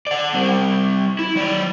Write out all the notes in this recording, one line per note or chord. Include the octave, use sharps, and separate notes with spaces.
D5 F#5
G3 C4
E4
F#3 D5